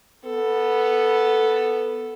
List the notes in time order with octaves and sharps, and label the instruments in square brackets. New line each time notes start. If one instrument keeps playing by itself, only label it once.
[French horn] B3 [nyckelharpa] A4